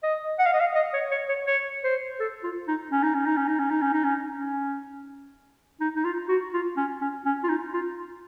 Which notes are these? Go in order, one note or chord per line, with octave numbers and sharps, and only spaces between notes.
D#5
F#5
F5
D#5
F5
D#5
C#5
C#5
C#5
C#5
C5
A4
F4
D#4
C#4
D#4
C#4
D#4
C#4
D#4
C#4
D#4
C#4
D#4
C#4
C#4
D#4
D#4
F4
F#4
F4
C#4
C#4
C#4
F4
D#4
F4